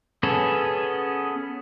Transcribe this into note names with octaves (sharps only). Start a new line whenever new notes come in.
B3 C#4 G#4 A4